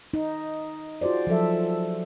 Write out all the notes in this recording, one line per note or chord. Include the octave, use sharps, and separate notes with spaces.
D#4
F4 F#4 G#4 C5 D5
F3 F#3 A4 E5